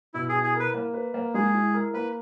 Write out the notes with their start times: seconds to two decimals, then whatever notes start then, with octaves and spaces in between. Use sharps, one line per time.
0.14 B2 E4
0.29 G#4
0.34 E4
0.43 G#4
0.54 A#4
0.60 B4
0.74 A#3
0.93 B4
1.14 A#3
1.34 G#3 G#4
1.54 E4
1.74 A#4
1.94 A#3 B4